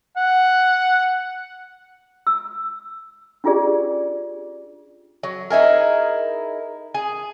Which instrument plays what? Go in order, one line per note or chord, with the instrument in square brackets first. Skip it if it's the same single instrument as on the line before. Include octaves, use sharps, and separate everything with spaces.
[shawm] F#5
[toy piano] E6
C#4 D4 F4 G4 G#4 D5
[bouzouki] F#3
D#4 E4 G#4 A#4
G#4